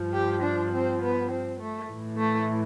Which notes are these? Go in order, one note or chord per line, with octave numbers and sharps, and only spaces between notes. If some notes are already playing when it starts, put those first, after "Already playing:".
Already playing: G2 F3
G4
D4
C4
B3
C4
A3
A2 E3
A3